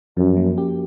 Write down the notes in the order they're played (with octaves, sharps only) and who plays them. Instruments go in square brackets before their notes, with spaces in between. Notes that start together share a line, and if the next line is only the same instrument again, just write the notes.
[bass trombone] F#2 [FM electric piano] F3
[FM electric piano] A#3
G4